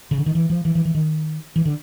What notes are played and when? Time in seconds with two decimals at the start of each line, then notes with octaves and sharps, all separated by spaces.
0.11 C#3
0.18 D3
0.26 D#3
0.35 E3
0.50 F3
0.65 E3
0.75 E3
0.85 E3
0.95 D#3
1.56 E3
1.65 D3